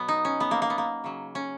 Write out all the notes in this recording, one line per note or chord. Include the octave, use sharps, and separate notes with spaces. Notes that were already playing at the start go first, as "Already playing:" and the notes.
Already playing: B2 F#3 B3
D#4
C#4
B3
A#3
A#3
B3
A#3
C#3 F#3
C#4